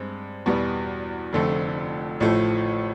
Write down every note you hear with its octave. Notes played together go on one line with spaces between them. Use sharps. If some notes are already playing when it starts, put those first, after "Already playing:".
Already playing: G2 G#3 C4
E2 B2 G3 B3
F1 F2 D3 F3 A3
A1 A2 F3 A3